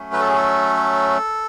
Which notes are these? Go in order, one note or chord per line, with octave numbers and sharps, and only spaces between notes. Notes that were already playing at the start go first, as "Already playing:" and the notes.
Already playing: F#3 A3 C#4
B4
A4
G#4
A4